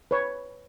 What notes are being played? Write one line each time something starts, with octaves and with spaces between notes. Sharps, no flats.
B4 C#5